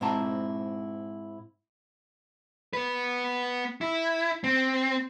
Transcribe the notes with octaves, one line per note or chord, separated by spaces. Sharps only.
G#2 C4 E4 A5 A#5
B3 B4
E4
C4